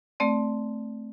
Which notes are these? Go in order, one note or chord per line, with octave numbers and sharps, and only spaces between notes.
A3 C4 D5